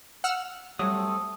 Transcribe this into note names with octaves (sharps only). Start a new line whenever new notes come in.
F#5 E6 F6
F#3 G3 A3 C4 A4 D#6